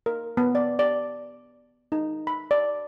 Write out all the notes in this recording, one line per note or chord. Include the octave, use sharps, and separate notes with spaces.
A#4
B3
D5
D5
D#4
B5
D5